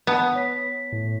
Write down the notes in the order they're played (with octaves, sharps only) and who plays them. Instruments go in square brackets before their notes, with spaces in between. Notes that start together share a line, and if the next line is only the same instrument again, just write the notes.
[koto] B3 [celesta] A5
[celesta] C#5 B6
[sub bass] A2